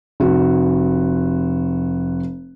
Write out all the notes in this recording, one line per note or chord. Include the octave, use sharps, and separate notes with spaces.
F1 F#4